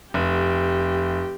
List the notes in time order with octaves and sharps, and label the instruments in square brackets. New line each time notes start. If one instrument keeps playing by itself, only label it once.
[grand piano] F1 [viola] G4